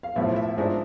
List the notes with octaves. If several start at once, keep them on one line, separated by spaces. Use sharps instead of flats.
F5
B1 A2 F3 E5
E5
G#2 F3 G#3 D4 E5